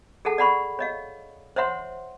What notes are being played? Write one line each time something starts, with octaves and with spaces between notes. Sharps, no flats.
G#4 A4 F#5 A5
D5 F#5 B5 C#6
C#5 D#5 F5
C5 C#5 E5 F#5 C6